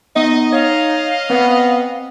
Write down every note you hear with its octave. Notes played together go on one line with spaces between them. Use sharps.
B3 D#4 D#5
C#5 D#5 F5
B3 C4